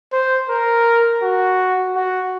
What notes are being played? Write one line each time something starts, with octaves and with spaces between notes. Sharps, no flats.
C5
A#4
F#4
F#4